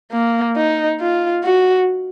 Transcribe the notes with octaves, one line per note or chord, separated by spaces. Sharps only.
A#3
D#4
F4
F#4